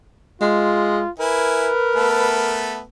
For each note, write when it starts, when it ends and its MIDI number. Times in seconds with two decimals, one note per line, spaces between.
0.41 1.03 56
0.41 1.10 65
1.20 1.69 64
1.20 2.74 70
1.20 2.39 71
1.20 1.69 80
1.96 2.82 57
1.96 2.82 59
1.96 2.82 69